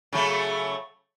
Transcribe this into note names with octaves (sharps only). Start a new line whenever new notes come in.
C#3 F#3 A3